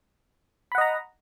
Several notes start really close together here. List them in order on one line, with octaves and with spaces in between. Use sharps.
B5 F#5 D#5 A#5